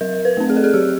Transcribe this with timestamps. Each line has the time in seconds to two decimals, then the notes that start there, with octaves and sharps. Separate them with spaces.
0.01 F#3 A#4
0.25 B4
0.37 A3 C4
0.50 G#4
0.57 A4
0.64 G#4
0.74 F#3 G4